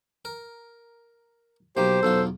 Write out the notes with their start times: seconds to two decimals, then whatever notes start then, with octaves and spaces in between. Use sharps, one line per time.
0.25 A#4
1.77 B1 A#3 G4 C5
2.03 B1 E2 F4 A4